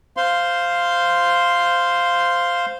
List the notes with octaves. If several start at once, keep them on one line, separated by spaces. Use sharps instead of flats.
C5 F5 C6